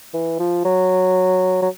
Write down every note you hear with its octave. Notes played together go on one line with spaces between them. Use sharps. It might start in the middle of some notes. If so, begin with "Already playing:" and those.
E3
F3
F#3
F#3